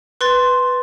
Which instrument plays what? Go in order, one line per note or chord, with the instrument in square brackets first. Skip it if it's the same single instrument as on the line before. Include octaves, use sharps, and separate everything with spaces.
[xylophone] B4 C6 A6